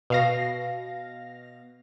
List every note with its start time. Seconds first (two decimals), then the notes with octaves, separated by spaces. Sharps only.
0.10 B2 F5 A#6